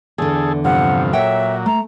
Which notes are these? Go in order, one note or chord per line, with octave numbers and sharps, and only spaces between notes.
E2 D3 G#4 A4
G2 C3 F3 F#5
A#2 F#3 C#5 E5 F#5 G5
A3 A#5